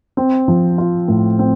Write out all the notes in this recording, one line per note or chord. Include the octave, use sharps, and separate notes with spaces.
C4
F3
F4
A2
C4